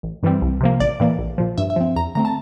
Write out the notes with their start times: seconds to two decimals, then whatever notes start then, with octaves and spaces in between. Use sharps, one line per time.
0.03 A1
0.23 G2 E3 G3 C4
0.42 C2
0.61 C3 F3 A#3
0.80 A1 D5
1.00 A2 E3 A#3
1.19 A#1
1.38 A#2 F3
1.58 G2 E5
1.70 E5
1.76 F3 C4
1.96 E2 A#5
2.15 D3 A3 C4 A#5
2.25 A5